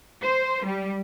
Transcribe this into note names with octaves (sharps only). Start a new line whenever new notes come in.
C5
G3